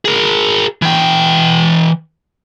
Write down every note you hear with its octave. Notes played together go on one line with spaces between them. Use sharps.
G#4 A#4
E3 G5